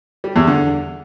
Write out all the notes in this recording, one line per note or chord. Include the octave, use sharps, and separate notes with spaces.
G3
E2
D3